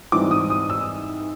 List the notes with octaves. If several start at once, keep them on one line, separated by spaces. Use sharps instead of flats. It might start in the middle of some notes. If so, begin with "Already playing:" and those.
G#2 E3 G3 C4 D6
D#6
D#6
E6